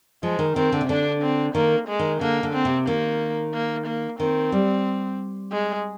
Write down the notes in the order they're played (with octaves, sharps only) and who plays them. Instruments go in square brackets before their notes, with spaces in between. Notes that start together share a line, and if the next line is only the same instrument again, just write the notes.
[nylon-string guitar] F3 [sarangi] G#3
[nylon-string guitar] D#3
[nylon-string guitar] D#3 [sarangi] C4
[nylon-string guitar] D3
C3
[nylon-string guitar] D3 [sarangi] D4
[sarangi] C4
[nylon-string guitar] D#3 [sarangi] A#3
[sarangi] G#3
[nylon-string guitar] D#3
[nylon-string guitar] D3 [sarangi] A#3
[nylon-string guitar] D3
[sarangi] C4
[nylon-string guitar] C3
[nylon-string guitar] D#3 [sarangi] A#3
[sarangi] A#3
A#3
[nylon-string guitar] D#3 [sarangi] C4
[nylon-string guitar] G3
[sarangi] G#3